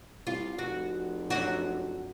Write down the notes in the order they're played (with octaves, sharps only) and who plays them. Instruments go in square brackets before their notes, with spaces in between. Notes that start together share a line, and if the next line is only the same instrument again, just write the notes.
[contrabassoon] C2 [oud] F4
[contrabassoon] F1 [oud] F#4
[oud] F#2 D4 F#4